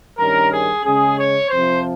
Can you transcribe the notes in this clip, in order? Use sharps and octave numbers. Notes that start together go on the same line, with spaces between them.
G2 D#3 G3 C#4 A#4
G#4
C#3 G#3 C#4 G#4
C#5
F2 C3 F3 C5